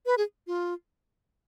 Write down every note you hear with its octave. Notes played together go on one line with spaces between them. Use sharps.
B4
G#4
F4